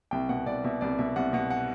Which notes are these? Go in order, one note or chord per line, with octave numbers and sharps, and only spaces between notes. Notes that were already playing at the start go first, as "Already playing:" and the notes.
C2 G5
B2 F#5
C2 D5
B2 E5
C2 D5
B2 E5
C2 F#5
B2 F#5
F#5